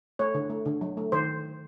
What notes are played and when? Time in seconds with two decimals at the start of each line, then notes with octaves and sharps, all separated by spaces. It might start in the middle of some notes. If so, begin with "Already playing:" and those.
0.19 A3 C#5
0.34 D3
0.50 A3
0.66 D3
0.81 F#3
0.97 A3
1.12 D#3 C5